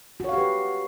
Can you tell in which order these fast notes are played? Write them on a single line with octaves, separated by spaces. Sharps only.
F#4 C#5 F5 G4 B4